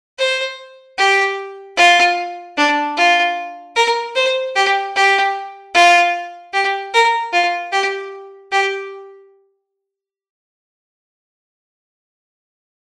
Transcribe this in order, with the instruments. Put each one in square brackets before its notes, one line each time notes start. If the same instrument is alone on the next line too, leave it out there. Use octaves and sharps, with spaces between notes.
[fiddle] C5
G4
F4
D4
F4
A#4
C5
G4
G4
F4
G4
A#4
F4
G4
G4